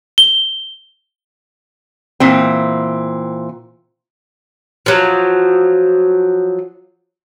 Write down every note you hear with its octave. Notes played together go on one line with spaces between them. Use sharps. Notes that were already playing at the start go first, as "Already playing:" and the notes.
G7
A#2 E3 C4
F3 F#3